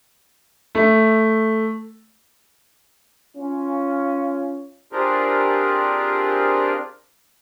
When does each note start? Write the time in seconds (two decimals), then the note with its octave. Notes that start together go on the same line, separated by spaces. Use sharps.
0.75 A3
3.36 C#4 F4
4.93 C4 D4 F4 G4 G#4 A#4